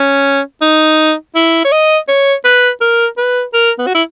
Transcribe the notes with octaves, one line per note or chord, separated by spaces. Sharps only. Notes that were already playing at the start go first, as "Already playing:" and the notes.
Already playing: C#4
D#4
E4
C#5
D#5
C#5
B4
A#4
B4
A#4
B3
F#4
E4